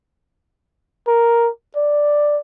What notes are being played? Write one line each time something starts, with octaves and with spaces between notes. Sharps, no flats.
A#4
D5